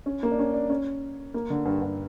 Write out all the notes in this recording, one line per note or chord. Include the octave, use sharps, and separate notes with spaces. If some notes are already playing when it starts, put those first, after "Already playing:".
C#4
A#3
D4
C#4
D4
C#4
A#3
D3
G2
G2